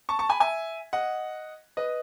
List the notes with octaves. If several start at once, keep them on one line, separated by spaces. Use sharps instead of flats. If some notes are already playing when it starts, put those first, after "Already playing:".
A5 C#6
A5 C#6
G#5 B5
E5 G#5
D#5 F#5
B4 D#5